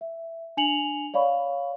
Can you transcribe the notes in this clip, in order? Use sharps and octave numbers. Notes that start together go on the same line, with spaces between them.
E5
D4 G#5 C#7 F7 F#7
C#5 D5 F5 B5 C#6